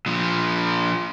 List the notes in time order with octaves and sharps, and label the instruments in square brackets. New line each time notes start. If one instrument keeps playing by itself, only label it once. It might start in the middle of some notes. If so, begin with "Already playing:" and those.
[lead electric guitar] A#2 F3